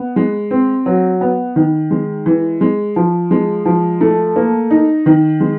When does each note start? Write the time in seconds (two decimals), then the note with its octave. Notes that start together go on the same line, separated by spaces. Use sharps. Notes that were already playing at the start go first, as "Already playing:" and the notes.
Already playing: B3
0.16 G#3
0.51 C4
0.86 F#3
1.21 B3
1.56 D#3
1.91 G#3
2.26 E3
2.61 G#3
2.96 F3
3.31 G#3
3.65 F3
4.01 A3
4.36 A#3
4.71 D#4
5.06 D#3
5.40 G#3